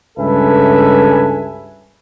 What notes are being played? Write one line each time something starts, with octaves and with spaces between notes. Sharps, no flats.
C#2 G2 A4 B4 E5 G#5